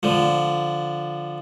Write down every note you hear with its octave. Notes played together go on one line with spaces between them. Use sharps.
D3 F3